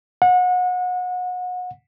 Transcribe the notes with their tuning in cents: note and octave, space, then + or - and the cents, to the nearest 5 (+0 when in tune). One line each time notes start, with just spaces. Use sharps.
F#5 -30